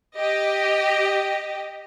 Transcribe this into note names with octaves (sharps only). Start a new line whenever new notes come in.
G4 D#5